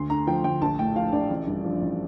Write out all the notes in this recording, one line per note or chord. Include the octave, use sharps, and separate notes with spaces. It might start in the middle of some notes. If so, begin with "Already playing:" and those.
Already playing: D2 C6
D3 A#5
F3 G5
D2 G5
A#1 A5
A2 G5
F3 F5
A#1 D5
A1
G2
F3
A1